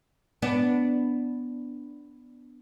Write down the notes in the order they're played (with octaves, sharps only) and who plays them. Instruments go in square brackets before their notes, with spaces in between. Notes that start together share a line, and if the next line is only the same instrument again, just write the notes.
[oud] B3 D4